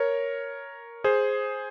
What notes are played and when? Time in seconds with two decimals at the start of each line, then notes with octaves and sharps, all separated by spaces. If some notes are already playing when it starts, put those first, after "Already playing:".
Already playing: A#4 C#5
1.04 G#4 C5